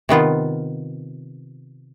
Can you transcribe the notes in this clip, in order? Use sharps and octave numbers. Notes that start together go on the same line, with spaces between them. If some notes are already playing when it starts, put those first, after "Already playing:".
C3 D#3 B3 F4